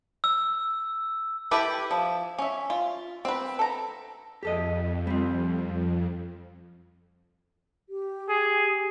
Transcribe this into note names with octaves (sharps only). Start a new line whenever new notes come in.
E6
E4 G4 A4 B4
F3
C#4 E5
F4
C4 B4
A4 A#5
F2 G4 A4 D#5
G3 C4
G4
G#4